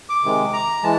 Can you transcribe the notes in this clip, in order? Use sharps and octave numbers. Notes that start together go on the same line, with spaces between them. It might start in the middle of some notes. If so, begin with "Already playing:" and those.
D6
C3 D#3 G#3
A#5
E3 G#3 A5